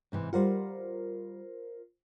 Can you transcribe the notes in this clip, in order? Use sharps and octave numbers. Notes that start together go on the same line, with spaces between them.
G#2 C3 E3
G3 F4 A#4 C5 F#5